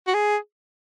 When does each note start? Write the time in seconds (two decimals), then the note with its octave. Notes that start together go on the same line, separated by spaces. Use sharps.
0.07 F#4
0.14 G#4